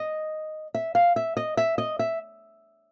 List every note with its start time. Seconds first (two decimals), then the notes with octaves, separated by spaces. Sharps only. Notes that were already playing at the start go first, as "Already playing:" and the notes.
Already playing: D#5
0.74 E5
0.95 F5
1.16 E5
1.37 D#5
1.57 E5
1.78 D#5
1.99 E5